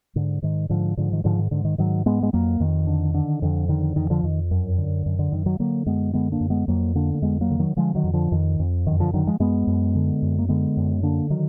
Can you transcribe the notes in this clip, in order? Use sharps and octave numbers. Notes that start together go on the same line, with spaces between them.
G#2 D3
G#2 D#3
G#2 D3 F3
G#2 D3 F3
D#3
G#2 D3 F3
D#3
G#2 D3
D#3
G#2 D#3 F#3
G#2 G#3 B3
G#3
F2 F#3 A#3
F2 D#3
D3
D3
F2 D3
D3 D#3
F2 D#3
D3 F3
F2 D#3
F#2
D3
F#2
D3
F#2 D#3
D#3 F#3
D3 F#3 A#3
F#2 G#3 B3
D3 G#3 B3
A#3 D4
F#2
G#3 B3
F2 F#3 A#3
D3 A#3 D4
A#3
F2 G#3 B3
F#3 A#3
D3
D#3 F#3
D3 F3 G#3
D#3 F#3
F2
D3 F3
F2 D#3
F2
F#2 D#3
D3 F3
D3 D#3 F#3
F3 G#3
F#2 G#3 B3
F#2
D3
F#2
A#3
D3 G#3 B3
F#2
D3 A#3 D4
D#3 F#3